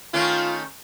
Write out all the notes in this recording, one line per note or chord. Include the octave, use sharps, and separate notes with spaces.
D#3 A3 C#4 F4